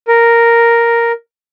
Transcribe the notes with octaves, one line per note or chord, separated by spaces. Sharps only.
A#4